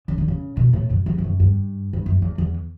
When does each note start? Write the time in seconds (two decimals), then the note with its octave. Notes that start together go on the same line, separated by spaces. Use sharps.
0.08 C#3
0.18 D3
0.28 C#3
0.57 B2
0.73 A2
0.90 F#2
1.06 E2
1.18 E2
1.24 F#2
1.40 G2
1.93 G2
2.06 F#2
2.22 E2
2.38 E2